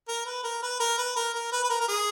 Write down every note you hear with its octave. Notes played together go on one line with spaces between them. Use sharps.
A#4
B4
A#4
B4
A#4
B4
A#4
A#4
B4
B4
A#4
A#4
G#4